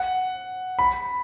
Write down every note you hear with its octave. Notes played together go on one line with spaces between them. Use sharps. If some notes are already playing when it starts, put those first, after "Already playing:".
Already playing: F#5
B5